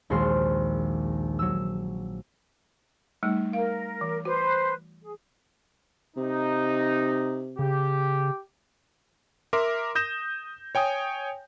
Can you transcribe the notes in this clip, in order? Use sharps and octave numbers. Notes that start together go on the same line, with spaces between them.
A#1 D#2 G#3 F#4 C6 F6
F#3 E6
G3 A3 D#4
A#4 F5
E3
F#4 B4 C5
G#4
C3 D#4
C#3 G4
A#4 E5 C6 D6
D#6 G6 A#6 E7
C#5 G5 G#5 D#6